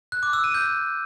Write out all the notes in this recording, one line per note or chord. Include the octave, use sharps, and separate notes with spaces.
F#6
D6
E6
D#7
G6